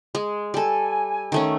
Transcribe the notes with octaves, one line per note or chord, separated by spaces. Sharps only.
G#3
G3 A4 G#5
D#3 A3 C#4